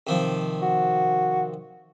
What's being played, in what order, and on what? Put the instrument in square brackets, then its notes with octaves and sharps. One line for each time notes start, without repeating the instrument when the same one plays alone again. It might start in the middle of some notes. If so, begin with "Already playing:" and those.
[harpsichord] C3 D#3 F3
[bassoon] F#4